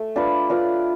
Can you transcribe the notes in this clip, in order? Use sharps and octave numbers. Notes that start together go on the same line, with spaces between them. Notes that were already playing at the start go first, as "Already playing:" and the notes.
Already playing: A3
D4 F4 B4 D5
D4 F4 B4 D5